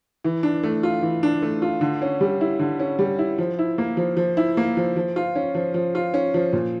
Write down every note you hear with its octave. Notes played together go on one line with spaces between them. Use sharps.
E3
D4
A3
F4
E3
D4
A3
F4
D3
C#4
G3
E4
D3
C#4
G3
E4
F3
E4
A#3
F3
F3
E4
A#3
F3
F3
F4
C#4
F3
F3
F4
C#4
F3
A#2